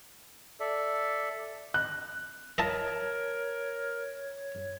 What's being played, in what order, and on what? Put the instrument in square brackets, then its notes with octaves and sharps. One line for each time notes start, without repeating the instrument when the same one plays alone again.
[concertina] A4 D5 E5
[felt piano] F#6
[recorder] A#4 [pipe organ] C#5 [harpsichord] D#5 E5 A5